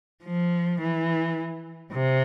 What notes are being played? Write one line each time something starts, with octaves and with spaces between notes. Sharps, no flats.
F3
E3
C3